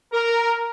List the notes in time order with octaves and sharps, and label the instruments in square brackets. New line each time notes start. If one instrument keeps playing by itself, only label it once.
[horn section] A#4